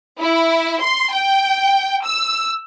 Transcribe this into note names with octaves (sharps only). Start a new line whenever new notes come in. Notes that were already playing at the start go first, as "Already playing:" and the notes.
E4
C6
G5
E6